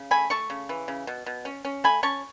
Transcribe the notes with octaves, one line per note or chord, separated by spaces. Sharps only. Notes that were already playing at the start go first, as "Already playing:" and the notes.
Already playing: C#3
A3 G#5 B5
A3 A5 C#6
C#3
E3
C#3
B2
B2
C#4
C#4
A3 G#5 B5
C#4 A5 C#6